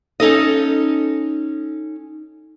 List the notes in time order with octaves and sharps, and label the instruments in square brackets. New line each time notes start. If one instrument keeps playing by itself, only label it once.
[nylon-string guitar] C#4 D#4 A4 D#5